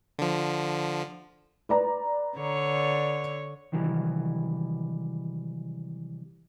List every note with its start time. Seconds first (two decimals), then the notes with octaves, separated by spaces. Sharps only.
0.19 D3 F3
1.69 B4 D5 A#5
2.36 D3 C#5
3.72 C3 D#3 E3 F#3 G3